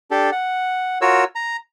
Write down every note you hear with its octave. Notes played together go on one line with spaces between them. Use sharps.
D4 G4 A4
F#5
F4 F#4 A#4 C#5 E6
A#5